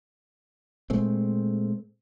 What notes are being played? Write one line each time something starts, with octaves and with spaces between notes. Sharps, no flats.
A#2 G#3 A3 C4